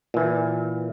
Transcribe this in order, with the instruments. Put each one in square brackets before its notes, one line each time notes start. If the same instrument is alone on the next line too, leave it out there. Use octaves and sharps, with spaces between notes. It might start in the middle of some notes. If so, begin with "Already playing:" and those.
[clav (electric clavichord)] A#2 E3